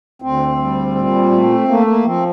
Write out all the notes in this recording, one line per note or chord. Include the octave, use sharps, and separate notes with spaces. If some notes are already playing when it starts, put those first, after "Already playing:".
D2 C4
G3
A#2
A3
A3 A#3
A#3
F3 C4